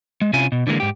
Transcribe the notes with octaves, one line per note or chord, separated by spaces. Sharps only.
G#3
C3 C#4 E4 F4 G#5
B2
D3 E3 G#3 A#3
G#2 G4